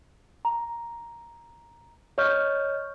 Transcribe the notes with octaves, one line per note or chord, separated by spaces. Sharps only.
A#5
C#5 D#5 C#6 F6 G6